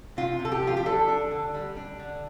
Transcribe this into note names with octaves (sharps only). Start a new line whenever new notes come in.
C3 F4
C3
A4
G4
F3 F4
G4
D4 A4
D4
D3
G3
D4
D3